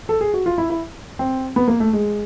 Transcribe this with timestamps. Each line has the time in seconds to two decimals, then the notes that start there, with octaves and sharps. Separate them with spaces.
0.09 A4
0.21 G#4
0.34 F#4
0.46 F4
0.58 E4
0.70 E4
1.19 C4
1.56 B3
1.68 A#3
1.80 A3
1.93 G#3